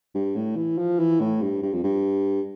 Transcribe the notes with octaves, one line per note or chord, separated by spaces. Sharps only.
G2
A2
E3
F3
E3
A2
G2
G2
F2
G2